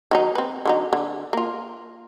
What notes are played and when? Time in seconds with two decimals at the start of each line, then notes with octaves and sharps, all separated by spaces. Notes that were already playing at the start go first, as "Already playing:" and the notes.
0.11 D#3 F#3 D#4
0.35 C4 B4
0.65 D3 F#3 D#4
0.93 D3
1.33 A#3 F4